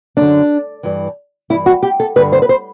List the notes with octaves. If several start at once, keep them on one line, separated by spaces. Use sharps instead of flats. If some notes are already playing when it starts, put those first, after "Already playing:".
F#2 D3 D4
G2 E3
G2 E3 E4
F#4
G4
A4
G2 D3 B4
C5
B4
C5